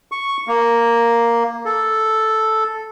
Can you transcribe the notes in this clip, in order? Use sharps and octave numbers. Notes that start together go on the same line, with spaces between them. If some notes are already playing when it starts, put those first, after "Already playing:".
C#6
A#3
A4